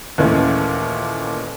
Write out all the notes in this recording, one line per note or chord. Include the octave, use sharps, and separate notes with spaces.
D#2 A#2 E3 G#3 A3 C#4